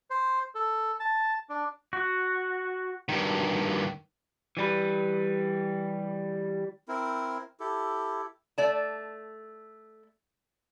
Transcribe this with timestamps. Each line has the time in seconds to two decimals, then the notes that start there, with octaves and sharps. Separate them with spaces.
0.10 C5
0.55 A4
1.00 A5
1.49 D4
1.93 F#4
3.09 G2 D#3
4.57 E3 G3 B4
6.88 C4 E4 A#4
7.60 E4 G4 A4
8.58 A3 D5 A5